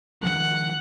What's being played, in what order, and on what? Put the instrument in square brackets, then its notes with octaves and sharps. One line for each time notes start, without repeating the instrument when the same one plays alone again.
[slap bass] D#3 F3 G#3 [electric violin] F#5